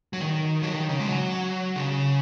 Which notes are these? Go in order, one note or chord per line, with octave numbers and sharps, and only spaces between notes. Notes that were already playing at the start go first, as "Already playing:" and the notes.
F#3
D#3
F#3
D#3
C#3
G#3
F#3
C#3